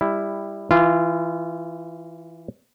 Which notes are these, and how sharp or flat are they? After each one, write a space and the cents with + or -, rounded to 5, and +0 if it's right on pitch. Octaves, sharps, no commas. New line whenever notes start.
G3 +20 E4 +0
E3 +0 F4 -20